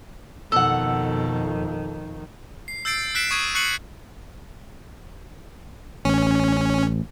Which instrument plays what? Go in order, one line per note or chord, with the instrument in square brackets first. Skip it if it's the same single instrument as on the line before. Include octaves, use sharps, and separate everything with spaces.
[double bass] F2 D#3 [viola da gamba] B2 [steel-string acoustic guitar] A4 F#5 [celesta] E6
[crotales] C7
E6 G6 A6 C7 D7
E6 F#6 B6 C7 D7 E7
C#6 D#6 G#6 D#7
C#6 F#6 C7 C#7 D#7 F#7
[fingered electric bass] A1 [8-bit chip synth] C#4